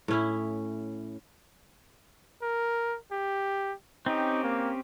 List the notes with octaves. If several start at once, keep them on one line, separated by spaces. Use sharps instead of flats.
A2 C#4 E4
A#4
G4
C4 C#4 D#4 G4
A#3